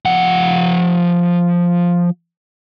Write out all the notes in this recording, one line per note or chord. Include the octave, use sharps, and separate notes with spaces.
F3 F#5